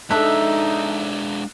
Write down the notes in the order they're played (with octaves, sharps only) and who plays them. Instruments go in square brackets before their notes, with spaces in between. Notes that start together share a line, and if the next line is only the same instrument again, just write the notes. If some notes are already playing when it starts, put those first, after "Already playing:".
[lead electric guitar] G#3 D4 [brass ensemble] D#4 [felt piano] A4 A5 F#6 [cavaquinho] E5